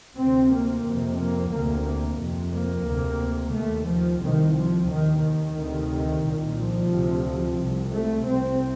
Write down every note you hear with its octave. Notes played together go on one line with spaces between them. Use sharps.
D2 C3 C4
A#3
F2 C3
A#3
D2 C3 A#3
F2 C3
A#3
D2 C3
D#2 A3
F3
C2 C3 D#3
F3
D#2 D#3
D#3
D2 C3
C2 A#2
F3
D2 C3
C2 C3
A3
C2 C3 C4